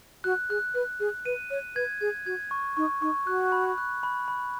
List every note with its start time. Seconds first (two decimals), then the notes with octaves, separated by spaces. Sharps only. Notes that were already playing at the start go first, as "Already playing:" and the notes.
0.24 F#4 F#6
0.50 G#4 F#6
0.75 B4 F#6
1.00 G#4 F#6
1.26 B4 D#7
1.51 C#5 F#6
1.76 B4 G#6
2.01 G#4 G#6
2.26 F#4 G#6
2.51 C#6
2.77 D#4 C#6
3.01 D#4 C#6
3.27 F#4 F#6
3.52 B5
3.78 F#6
4.03 B5
4.28 B5